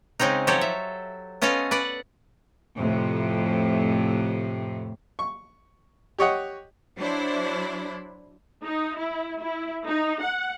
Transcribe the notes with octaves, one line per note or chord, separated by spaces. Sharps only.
C#3 G#3 C4 C#4 D#4
F3 F#3 G4 A4 C5 C#5
E5
B3 C#4 F4 A4 D#5 F5
B4 D5 F#5
F2 A2 C3
C#6
G4 C#5 D#5 F#5
F#3 D4 E4 C5
D#4
E4
E4
D#4
F#5